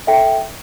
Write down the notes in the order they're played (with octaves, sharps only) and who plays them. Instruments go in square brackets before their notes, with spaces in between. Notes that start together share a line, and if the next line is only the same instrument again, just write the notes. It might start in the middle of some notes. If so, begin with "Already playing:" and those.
[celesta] A4 E5 G5